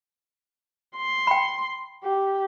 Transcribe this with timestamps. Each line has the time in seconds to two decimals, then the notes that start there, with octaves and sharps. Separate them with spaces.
0.96 C6
1.27 G5 B5
2.04 G4